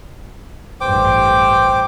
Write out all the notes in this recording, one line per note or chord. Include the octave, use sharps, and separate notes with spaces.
A1 G2 C5 G5 D6